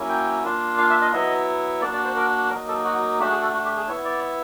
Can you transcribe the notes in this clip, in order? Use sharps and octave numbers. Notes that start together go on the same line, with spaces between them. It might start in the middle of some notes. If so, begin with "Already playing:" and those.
Already playing: F#3 A#3 C#4 E4
G5
A#3 D4 F4
F5
E5
D#5
F#3 B3 E4 D#5
A#3 D4 F#4 D5
D5
C5
A#4
F#3 A#3 D#4 A#4
A4
F#4
A3 D4 F#4 G4
G#4
A4
F#4
G4
G#4
B3 E4 C#5
D5